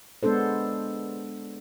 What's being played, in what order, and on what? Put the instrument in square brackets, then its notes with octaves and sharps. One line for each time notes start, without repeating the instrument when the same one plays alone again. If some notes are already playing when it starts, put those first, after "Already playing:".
[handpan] G#3 B3 D4 A4 C5